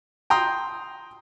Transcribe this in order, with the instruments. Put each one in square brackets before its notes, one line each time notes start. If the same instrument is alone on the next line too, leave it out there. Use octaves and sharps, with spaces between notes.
[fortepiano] G5 A#5 C6 D#6